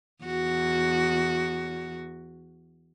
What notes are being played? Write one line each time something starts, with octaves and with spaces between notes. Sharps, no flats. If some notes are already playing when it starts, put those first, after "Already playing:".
E2 F#4